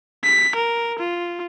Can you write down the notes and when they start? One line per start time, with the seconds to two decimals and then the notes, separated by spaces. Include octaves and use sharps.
0.24 B6
0.55 A#4
0.99 F4